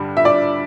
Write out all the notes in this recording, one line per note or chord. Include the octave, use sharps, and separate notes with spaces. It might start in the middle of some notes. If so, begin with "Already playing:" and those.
Already playing: G2 D3 G3
E5
D5